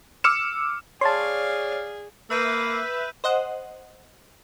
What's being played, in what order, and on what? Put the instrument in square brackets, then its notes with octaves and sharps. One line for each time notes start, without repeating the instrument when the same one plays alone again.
[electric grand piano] D6 E6 F6 C#7 E7
[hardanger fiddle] G#4 [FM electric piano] C#5 [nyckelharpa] D5 F5 [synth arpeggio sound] A5 C6
[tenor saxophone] A#3 [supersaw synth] B4 E5 [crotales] E6 G6 D#7
[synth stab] C5 D#5 F#5